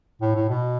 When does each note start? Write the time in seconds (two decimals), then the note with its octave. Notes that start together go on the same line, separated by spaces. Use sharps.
0.21 A2
0.35 A2
0.49 B2